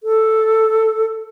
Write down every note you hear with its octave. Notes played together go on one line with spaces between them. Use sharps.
A4